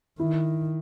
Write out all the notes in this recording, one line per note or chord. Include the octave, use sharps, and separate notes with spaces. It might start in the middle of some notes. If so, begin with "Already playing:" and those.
D#3 E4